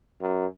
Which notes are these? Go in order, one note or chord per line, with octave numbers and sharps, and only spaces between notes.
F#2